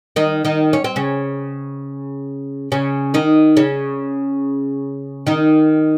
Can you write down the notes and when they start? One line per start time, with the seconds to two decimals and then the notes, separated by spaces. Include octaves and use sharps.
0.16 D#3 D#4
0.45 D#3 D#4
0.73 C#4
0.84 C4
0.96 C#3 C#4
2.72 C#3 C#4
3.14 D#3 D#4
3.57 C#3 C#4
5.27 D#3 D#4